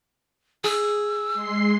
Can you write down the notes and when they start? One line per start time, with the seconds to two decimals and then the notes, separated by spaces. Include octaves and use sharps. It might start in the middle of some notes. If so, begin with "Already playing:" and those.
0.64 G#4 E6
1.34 G#3 C6 C7